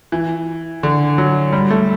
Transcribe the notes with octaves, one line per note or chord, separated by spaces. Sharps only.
E3
D3
F#3
G3
A3